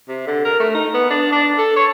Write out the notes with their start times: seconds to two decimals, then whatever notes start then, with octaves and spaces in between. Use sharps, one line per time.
0.08 C3
0.27 D3
0.44 A#4
0.60 A3
0.74 D#4
0.94 B3
1.10 D4
1.32 D4
1.58 A4
1.76 C#5